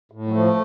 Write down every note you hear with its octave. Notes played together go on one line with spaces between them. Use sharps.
A2
F#3
F3 A3